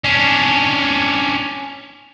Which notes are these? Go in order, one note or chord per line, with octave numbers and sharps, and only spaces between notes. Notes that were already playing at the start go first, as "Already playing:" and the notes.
C#4 D4